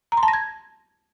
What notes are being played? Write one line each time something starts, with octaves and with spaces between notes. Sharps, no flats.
A#5
C6
A5
A#6
G#6